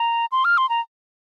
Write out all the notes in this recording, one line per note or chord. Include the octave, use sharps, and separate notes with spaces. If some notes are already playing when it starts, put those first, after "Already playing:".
Already playing: A#5
C6
F6
C6
A#5